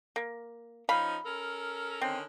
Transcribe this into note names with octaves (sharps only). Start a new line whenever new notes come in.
A#3
F3 C#4 D#4 F5 B5
C#4 A4 A#4
D3 D#3 C4 C#4